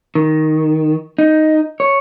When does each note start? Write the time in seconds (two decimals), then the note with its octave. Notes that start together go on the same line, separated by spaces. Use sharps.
0.15 D#3
1.19 D#4
1.80 C#5